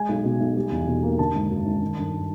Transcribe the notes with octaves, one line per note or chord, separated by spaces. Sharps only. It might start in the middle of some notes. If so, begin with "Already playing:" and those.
Already playing: G#3 G#5
B1
B2
B1
G3
E2
B2
A#3
D3 A5
G#1
F#2
G#1
D#3
G1